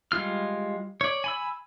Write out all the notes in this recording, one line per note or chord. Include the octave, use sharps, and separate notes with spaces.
G3 G#3 F4 F6
C#5 D5
G#5 B5 E6